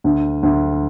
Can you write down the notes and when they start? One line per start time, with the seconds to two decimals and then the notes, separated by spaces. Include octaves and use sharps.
0.04 D2
0.43 D2